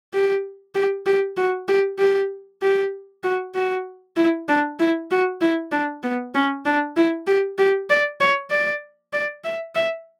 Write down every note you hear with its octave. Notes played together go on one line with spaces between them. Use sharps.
G4
G4
G4
F#4
G4
G4
G4
F#4
F#4
E4
D4
E4
F#4
E4
D4
B3
C#4
D4
E4
G4
G4
D5
C#5
D5
D5
E5
E5